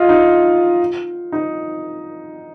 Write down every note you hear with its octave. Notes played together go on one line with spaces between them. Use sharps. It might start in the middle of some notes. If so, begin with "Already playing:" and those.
Already playing: F4 D#5
D#4
D#4